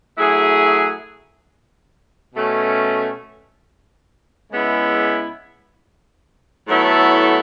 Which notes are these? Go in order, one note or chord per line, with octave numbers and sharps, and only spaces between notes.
F#3 A3 E4 G#4
B2 A3 C#4
C#3 G#3 B3 E4
A2 F#3 B3 E4 A4